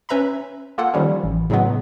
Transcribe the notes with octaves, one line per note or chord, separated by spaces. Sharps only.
C#4 B4 E5 A#5 B5
A#3 F4 A4 F#5
D#3 F3 G3 C#4
A1
A2 C#3 F#3 G#3 B3